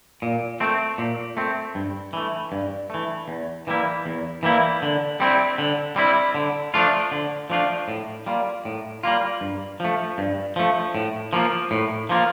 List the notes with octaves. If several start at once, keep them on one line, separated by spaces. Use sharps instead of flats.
A#2
A3 C4
A#2
A3 C4
G2
E3 A3
G2
E3 A3
E2
E3 G3 A#3 E4
E2
E3 G3 A#3 E4
D3
G3 C4 E4
D3
G3 C4 E4
D3
F3 A3 D4 F4
D3
F3 A3 D4 F4
A2
G3 A#3 F4
A2
G3 A#3 F4
G2
F3 A3
G2
F3 A3
A2
F3 A#3 F4
A2
F3 A#3 F4